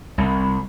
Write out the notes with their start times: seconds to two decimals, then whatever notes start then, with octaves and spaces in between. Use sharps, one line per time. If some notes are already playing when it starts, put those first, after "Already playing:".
0.18 C2